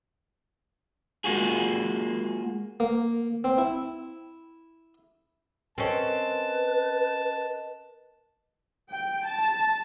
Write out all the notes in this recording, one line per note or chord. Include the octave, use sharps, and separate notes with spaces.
G#3 A#3 F4 F#4 G#4
A#3
C4
E4
C4 C#4 A#4 B4 D#5 A5
G5
A5